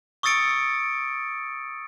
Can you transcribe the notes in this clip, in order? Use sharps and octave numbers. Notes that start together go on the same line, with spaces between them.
C#6 D#6 E6 A6 C#7 D7